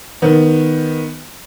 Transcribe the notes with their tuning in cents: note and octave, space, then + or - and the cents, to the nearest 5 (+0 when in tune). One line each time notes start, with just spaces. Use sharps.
D#3 +5 B3 +0